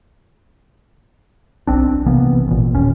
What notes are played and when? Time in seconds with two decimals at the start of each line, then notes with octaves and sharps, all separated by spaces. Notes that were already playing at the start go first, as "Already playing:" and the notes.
1.67 B1 C4 D4
2.06 C3 E3 A#3 B3
2.48 A1 A#2
2.75 D#1 D#2 C#4